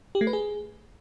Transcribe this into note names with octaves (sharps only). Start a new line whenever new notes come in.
G4
A3
B4
G#4